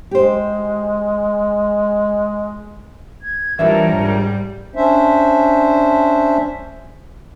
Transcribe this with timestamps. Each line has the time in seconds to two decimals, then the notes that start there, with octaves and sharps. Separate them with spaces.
0.11 G#3 G4 C5
3.22 G#6
3.59 E3 F3 G3 D4 A#4 C#5 E5
3.93 G#2
4.76 C#4 D4 C5 E5